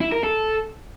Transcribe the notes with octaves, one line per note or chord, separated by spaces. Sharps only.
E4
A#4
A4